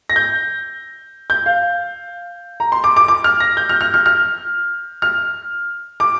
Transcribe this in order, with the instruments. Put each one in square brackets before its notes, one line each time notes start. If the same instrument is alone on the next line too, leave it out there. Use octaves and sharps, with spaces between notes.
[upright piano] A#6
G6
G6
F5
A#5
C6
D6
D6
D6
F6
A#6
G6
F6
F6
F6
F6
F6
D6